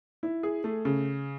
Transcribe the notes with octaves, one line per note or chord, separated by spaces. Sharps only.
E4
G#4
A3
C#3